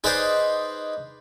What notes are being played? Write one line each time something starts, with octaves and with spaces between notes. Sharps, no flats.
D#4 G#4 B4 C5 D5